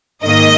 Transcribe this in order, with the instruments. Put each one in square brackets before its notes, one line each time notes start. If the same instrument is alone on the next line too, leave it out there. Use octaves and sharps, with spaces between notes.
[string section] G#2 D#3 A#3 D#5